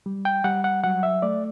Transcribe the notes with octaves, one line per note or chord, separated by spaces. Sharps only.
G3
G5
G3 F#5
F#5
F#3 F#5
E5
A3 D5